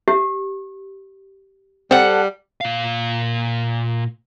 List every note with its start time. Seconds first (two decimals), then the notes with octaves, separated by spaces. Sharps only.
0.08 G4
1.91 G3 C4 A4 F#5
2.61 A#2 F5